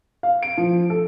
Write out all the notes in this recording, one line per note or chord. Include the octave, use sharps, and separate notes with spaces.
F5
D7
F3
A4